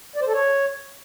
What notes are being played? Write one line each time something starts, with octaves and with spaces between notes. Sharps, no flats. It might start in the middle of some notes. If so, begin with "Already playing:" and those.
D5
C5
A4
C#5